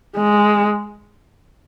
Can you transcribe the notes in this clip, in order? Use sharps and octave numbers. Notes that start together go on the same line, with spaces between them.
G#3